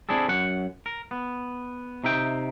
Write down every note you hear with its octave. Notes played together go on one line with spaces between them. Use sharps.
C4 D4 E4 G#4 A4
F#2 F#5
A#4
B3
C3 D#4 E5 G5